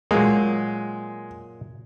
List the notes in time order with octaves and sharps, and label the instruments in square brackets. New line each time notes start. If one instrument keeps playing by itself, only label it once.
[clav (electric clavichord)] A#2 F#3 A#3 [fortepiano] G#3